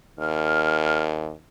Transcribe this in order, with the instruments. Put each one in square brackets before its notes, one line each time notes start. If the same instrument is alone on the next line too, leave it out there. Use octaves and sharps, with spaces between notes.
[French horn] D#2 [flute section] F6